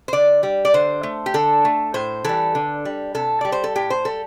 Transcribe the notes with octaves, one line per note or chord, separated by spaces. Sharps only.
C5
D3 D5
G3
D5
D3 C5
A3
G4
D3 A4
A3
A2 C5
E3 G3 A4
D3
G3
C3 A4
G3 D5
C5
A4
A2 G4
C5
G3 A4